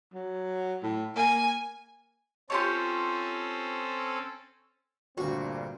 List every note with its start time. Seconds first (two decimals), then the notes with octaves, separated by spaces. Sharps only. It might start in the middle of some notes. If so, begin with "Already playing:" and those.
0.14 F#3
0.83 A2
1.16 A#3 G#5
2.50 C4 C#4 F4 G4 A4 C#5
5.18 D2 G2 A#2 C4 F#4 C#6